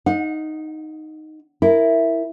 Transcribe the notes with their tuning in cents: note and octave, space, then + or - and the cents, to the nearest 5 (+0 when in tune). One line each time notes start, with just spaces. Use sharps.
D#4 +0 F#5 -40
E4 +0 A#4 -10